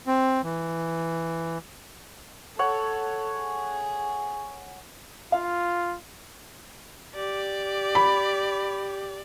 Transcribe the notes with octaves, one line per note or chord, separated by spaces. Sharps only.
C4
E3
A4 C#5 F#5
G#4
F4 F5
G4 D5
B5